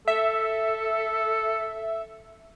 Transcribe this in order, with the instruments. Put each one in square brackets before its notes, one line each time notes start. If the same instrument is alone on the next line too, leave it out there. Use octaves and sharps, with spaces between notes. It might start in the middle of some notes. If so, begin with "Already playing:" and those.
[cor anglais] A4 [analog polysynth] E5